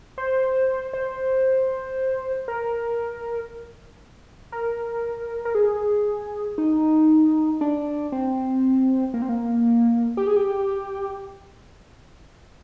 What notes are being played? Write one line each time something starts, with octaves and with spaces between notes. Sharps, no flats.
C5
C5
A#4
A#4
A#4
G#4
D#4
D4
C4
A#3
C4
A#3
G4
G#4
G4